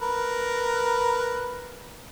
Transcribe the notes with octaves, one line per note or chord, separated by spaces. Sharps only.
A#4 B4